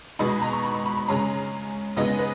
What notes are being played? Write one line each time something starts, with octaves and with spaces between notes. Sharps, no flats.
B2 G#3 B3 D#4 B5
B5
A#5
C#6
B5
C#6
B5
B5
C#3 G#3 C#4 A#5
C#3 G#3 B3 D#4 D#5
B4